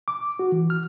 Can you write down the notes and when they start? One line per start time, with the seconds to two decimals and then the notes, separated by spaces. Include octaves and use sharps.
0.08 D6
0.39 F#4
0.52 E3
0.70 F6